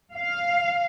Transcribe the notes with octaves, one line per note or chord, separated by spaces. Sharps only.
F5